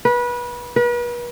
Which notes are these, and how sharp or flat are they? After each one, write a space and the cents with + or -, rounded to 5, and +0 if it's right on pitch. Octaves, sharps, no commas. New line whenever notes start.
B4 -25
B4 -40